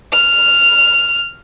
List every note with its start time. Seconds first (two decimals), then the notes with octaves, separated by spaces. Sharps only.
0.13 F6